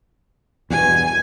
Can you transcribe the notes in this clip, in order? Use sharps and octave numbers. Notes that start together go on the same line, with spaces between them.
E2 G2 B2 G#5